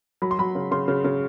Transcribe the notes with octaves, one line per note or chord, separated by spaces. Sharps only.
F#3 B5
C6
F#3 B5
C#3
C#3 C6
C#3
C#3